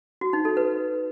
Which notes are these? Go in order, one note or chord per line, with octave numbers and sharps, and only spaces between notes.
F#4
D#4
A4
B4